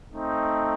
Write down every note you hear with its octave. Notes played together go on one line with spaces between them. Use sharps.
A3 C4 D#4